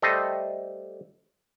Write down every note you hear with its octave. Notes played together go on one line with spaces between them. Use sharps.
G3 A3 A4 C5 D#5